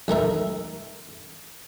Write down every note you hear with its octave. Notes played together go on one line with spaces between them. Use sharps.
B1 A3 A#4 E5